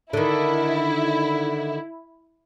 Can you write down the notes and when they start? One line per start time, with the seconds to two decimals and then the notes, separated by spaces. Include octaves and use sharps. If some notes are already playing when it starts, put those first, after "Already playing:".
0.13 D3 D#3 E4